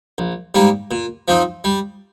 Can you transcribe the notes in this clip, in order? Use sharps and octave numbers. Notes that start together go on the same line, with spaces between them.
A#1
G#2 G3 A#3
A#2
F3 C4 D#4
G3